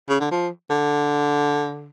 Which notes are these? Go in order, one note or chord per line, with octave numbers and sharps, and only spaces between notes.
C#3
D3
F3
D3